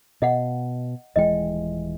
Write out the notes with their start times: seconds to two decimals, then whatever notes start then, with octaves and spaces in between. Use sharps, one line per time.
0.22 B2 D#5 F5 F#5
1.16 D#1 E3 G#3 D#5 G5